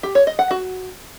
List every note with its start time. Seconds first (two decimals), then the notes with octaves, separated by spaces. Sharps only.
0.03 G4
0.15 C#5
0.27 D#5
0.39 F#5
0.51 F#4